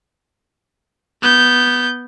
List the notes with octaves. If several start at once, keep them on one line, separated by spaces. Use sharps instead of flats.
B3 G6